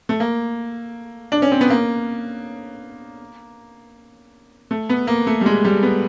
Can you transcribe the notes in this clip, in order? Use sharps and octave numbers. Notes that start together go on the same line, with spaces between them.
A3
A#3
D4
C#4
C4
B3
A#3
A3
B3
A#3
A3
G3
G#3
G3
B3